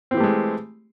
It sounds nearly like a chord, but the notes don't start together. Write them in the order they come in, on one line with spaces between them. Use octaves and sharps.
C4 E3 G4 A3 G#3